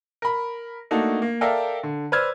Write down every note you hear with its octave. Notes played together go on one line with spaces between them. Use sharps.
A#4 B5
A3 A#3 D4 D#4 F#4 A4
A#3
A4 A#4 D5 E5 F5 G5
D3
B4 C5 D5 E6 F6 G#6